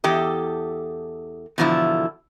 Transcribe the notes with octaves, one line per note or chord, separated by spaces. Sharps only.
E2 G4 A4 D#5
E2 B2 D3 F3 E4